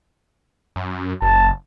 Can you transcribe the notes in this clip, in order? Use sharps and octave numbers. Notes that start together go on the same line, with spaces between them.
F#2
F#1 A5